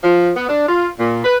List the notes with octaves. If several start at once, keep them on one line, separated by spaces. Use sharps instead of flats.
F3
B3
D4
F4
A#2
B4